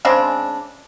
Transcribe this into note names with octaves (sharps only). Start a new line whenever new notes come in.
C#3 G#3 C4 D4